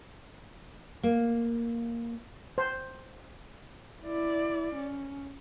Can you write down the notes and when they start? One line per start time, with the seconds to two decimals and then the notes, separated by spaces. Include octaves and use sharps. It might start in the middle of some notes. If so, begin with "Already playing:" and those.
1.03 A#3
2.58 C5
4.03 E4 D5
4.74 C#4